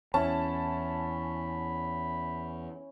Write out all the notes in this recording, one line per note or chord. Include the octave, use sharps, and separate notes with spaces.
E2 C#4 E4 A5 B5